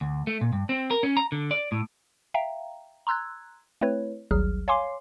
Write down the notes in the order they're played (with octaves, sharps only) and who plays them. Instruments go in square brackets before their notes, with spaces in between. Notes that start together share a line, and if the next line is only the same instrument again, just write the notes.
[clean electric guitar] D2
A3
A#2
G2
C4
A#4
C#4
A#5
D3
D5
A2
[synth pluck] E5 F5 G5 A#5
A#5 C6 E6 F#6 G#6
A3 C4 E4 B4 C#5
G#1 D2 F#3 G3 G#4 F6
C#5 F5 G#5 C6 D6 C7